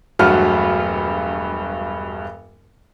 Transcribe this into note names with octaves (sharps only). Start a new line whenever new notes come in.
E1 G2 F#3 A3 F#4 F6